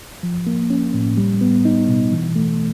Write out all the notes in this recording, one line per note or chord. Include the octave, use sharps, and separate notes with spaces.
F3
A#3
C#4
A2
G3
B3
D#4
B2
E3
A3